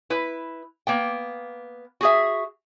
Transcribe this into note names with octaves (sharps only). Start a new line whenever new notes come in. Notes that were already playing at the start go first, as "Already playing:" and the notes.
E4 B4
A#3 B3 G5
F#4 G#4 E5